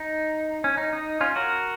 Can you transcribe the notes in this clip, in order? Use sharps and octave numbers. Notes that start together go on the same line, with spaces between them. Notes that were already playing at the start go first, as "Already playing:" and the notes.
Already playing: D#4
C#4
D#4
D#4
C#4 F4
F#4 A#4